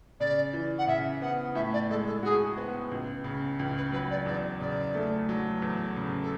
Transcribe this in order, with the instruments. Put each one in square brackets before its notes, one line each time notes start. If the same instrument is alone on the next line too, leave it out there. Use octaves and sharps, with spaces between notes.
[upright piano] C#3 [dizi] D5
[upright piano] E3
[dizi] F#5
[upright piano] C#3 [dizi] E5
[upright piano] B3 [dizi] F#5
[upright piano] A2 [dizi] E5
[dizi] D5
[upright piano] G#3 [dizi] A4
[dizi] A4
[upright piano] F#4 [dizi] G#4
[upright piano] B3
C#2
C#3
C#2
[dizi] B4
[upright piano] F#3 [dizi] B4
[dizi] D5
[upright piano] E2 [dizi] D5
[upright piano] C#3 [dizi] D5
[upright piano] A3
F#3
E2
C#3
[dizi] A4